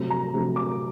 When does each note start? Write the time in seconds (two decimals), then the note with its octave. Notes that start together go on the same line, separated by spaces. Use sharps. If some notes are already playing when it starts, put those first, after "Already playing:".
Already playing: C3 F#3 A3
0.10 A#5
0.34 C3 F#3 A3
0.56 D6